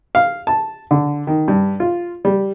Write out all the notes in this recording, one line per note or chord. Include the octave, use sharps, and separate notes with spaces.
F5
A5
D3
D#3
G2
F4
G3